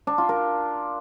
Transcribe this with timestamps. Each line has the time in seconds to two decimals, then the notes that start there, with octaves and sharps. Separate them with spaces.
0.07 D4
0.18 F4
0.29 A#4